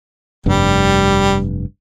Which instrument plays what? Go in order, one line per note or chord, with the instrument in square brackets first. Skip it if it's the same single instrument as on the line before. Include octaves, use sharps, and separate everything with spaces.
[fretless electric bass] F1 G2 [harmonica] G3